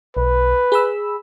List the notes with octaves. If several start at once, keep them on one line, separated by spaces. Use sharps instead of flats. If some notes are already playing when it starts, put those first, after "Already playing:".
B1 B4
G#4 B5 E6